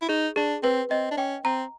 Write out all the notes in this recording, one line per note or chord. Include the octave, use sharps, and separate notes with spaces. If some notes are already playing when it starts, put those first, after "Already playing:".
E4
D#4 G#4
D4 G#4
C4 B4
C4 D#5
D4
C#4 G5
C4 A#5